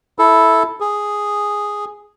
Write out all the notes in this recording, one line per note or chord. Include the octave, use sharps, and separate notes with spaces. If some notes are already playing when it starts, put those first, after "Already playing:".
E4 A4
G#4